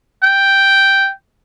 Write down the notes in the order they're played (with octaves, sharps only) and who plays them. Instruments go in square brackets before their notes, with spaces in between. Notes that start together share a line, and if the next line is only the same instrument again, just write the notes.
[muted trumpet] G5